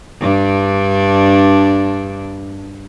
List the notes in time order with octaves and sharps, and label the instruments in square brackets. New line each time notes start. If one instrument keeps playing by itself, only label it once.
[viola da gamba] G2 D4